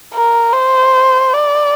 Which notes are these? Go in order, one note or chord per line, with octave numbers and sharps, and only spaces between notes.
A#4
C5
D5